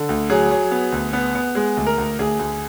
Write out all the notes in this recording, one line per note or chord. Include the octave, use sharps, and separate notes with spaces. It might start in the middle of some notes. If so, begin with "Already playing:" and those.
Already playing: D3
D2
F#3 G#4
F#3
B3
D2
B3
B3
G#3 G#4
D2
A#4
D2
D2 G#4
D2